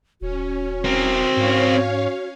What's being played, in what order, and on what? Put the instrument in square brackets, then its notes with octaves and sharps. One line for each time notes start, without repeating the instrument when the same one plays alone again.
[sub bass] D#1 [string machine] C#4 [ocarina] F#4
[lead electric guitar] C4 A#4
[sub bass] G#2 [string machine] C#4 C#5 F5